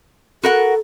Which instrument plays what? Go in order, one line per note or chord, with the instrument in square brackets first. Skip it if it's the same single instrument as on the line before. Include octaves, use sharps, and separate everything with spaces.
[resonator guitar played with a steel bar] F#4 A#4 F#5 [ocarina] A4